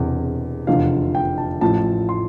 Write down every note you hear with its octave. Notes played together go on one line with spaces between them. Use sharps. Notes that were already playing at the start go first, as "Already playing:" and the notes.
Already playing: E1 E2 C3
F1 E2 D3 F3 F5
G5
A5
A1 A2 F3 A5
C6